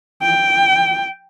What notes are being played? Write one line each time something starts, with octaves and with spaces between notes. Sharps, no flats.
G5